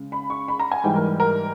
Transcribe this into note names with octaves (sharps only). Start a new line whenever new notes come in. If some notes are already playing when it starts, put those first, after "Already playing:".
Already playing: C#3 G#3
B5
C#6
B5
A#5
G#5
G#2 E3 G3 G5
A#4
A#4